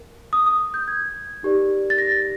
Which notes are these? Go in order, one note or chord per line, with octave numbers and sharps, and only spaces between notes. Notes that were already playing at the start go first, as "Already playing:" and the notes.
Already playing: A#4
D#6
D#6
G6
G#6
D#4 G4 A#4 D5
A6
A#6